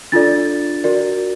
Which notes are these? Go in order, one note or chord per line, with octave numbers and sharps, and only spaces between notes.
D4 F4 A4 D5 A6
F#4 A#4 D5